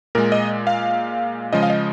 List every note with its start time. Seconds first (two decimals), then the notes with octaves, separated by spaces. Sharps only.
0.15 A#2 G#3 A#4
0.32 D#5
0.67 F5
1.53 C#3 F3 G#3 D#5
1.63 F5
1.70 D#5